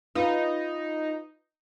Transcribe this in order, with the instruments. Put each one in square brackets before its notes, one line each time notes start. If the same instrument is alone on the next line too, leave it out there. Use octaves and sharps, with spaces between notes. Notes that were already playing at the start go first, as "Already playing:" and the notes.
[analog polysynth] D#4 [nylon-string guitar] F4 B4